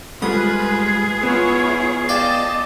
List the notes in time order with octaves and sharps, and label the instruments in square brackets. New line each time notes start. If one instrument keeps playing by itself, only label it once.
[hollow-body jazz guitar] G#2 G3 A3 [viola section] F4 B4 [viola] G#4 [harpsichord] D#6
[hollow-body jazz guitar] B3 [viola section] E4 F4 C#5
[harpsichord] D5 F5 G5 [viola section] D#5 [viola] A5